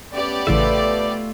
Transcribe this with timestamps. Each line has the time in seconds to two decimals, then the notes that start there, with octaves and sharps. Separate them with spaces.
0.12 A3 B3 C#4 G4 D5
0.47 A1 A2 C#3 A3 F4 A4 B4 E5